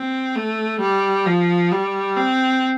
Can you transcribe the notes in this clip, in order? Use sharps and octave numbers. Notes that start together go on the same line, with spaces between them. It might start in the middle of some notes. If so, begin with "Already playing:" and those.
Already playing: C4
A3
G3
F3
G3
C4